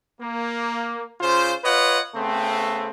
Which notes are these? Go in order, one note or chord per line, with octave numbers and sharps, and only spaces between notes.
A#3
C#3 F4 C5
F4 B4 C#5 D#5 F#5
C#3 A3 B3 C4